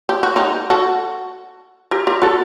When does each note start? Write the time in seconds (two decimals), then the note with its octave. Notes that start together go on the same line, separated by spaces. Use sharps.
0.09 G4
0.23 F#4
0.36 D#4 G4
0.70 F#4 A4
1.91 G4 A#4
2.07 G4 A#4
2.22 F#4 A4